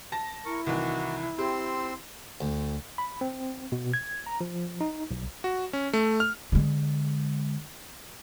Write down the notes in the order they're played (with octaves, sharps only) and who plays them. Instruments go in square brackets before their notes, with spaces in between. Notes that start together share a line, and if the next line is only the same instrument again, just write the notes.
[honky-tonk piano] A5 A#6
[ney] E4 [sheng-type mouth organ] A#4 C#6
[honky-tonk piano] C2 D#3 E3 [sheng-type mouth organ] F#4
[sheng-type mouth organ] C4 C6 E6 [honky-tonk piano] G4
[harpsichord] D2
[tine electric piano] B5
C4
B2
G#6
A#5
F3
D#4
B1
[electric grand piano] F#4
C#4
A3
F6
[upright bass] D3 G#3